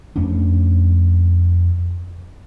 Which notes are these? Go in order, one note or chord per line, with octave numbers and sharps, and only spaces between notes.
F2 A3 C#4 D4